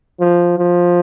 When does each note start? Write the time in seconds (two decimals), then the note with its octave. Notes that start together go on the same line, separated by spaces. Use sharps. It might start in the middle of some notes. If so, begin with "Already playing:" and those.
0.20 F3
0.58 F3